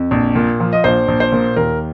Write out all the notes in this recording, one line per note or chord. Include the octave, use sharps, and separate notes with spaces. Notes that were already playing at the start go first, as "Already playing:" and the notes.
Already playing: F2
A#1
A#2
F3
D#5
A#1 C5
A#1
C5
A#2
D#2 A#4